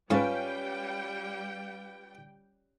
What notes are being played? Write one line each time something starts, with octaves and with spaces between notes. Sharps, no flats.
G#2 G3 C#4 F4 B4 G5 A5